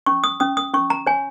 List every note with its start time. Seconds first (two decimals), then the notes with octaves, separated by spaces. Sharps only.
0.06 C#4 C#6
0.24 D#6
0.40 C#4 D#6
0.57 D#6
0.74 C#4 C#6
0.90 A#5
1.07 C#5 G#5